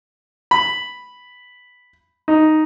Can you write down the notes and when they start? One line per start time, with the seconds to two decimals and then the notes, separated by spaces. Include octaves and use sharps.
0.51 B5
2.28 D#4